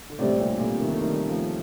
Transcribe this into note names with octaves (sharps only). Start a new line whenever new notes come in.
D3
A2 C3 G3 C4 G4 D5
A#2 D3
A#2 D3
C3 D#3
A3
D#3 G3
F3 A3